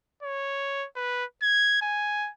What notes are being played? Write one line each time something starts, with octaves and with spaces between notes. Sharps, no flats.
C#5
B4
G#6
G#5